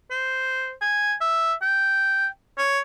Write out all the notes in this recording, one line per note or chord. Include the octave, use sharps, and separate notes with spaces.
C5
G#5
E5
G5
C#5